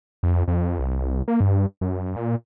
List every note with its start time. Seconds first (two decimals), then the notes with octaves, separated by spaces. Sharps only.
0.23 F2
0.48 F2
0.79 C2
1.28 A#3
1.40 G2
1.81 F#2
2.16 A#2